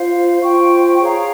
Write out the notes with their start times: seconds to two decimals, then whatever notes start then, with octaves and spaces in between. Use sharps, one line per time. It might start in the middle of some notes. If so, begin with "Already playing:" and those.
Already playing: F4 C5 F5
0.40 F4 C5 G5 C#6
1.00 G#4 C#5 F5 A#5